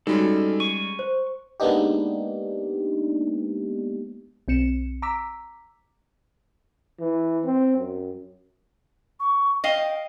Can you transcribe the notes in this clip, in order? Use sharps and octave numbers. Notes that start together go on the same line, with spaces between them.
G3 G#3 C#4 D#4 F#4 A4
C#6 D#7
C5
G#3 A#3 B3 D4 D#4 G4
B1 C4 C#7 E7
A#5 D6 E6 B6
E3
C4
F#2
C#6
D#5 F5 G5